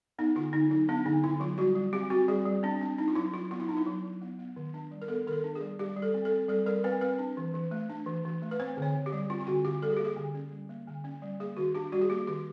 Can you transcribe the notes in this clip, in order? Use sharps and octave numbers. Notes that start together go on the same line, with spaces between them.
B3 D#4
D3 F4
D3 D#4
F#3 D#4
B3 D4
D3 D#4
D3 E4
F#3 F4
G3 F#4
G3
C4 G4
C4 F#4
G3 G#4
G3
C4 D4
C4 D4
D4 D#4
F4
F#3 E4
F#3 F4
B3 F4
E4
D4 D#4
E4
F#3
F#3
B3
B3
D#3
D4
G3
A#4
B3 A4
D#3 A#4
A4
D4
G#4
G3
G3 G4
G3
A4
C4
A4
C4
G3 A4
G3 A#4
C4 B4
C4 B4
D4
E3
E3
A3
D4
E3
E3
A3
B4
C4 C5
D3 C#5
D3
G4
G3
C4 F4
F4
D3 F#4
D3 G4
G3 A4
G#4
A#3 G4
G#4
D3
C#4
G3
A#3
D3
C#4
G3
A#3 G#4
D#3 F#4
D4 G4
G3 F#4
G#4
A#3 G4
D#3 G4